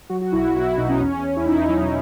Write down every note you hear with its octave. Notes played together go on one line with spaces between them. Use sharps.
F#3 F#4
F#4
B1 E4
E4
B1 F#4
E4
B2 D#4
C#4
E2 C#4
E2
E4
B2 D#4
F#3